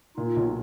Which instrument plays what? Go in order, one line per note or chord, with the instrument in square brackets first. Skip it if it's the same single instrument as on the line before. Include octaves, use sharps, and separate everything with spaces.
[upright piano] A#2 [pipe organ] D#4 F4
[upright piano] B1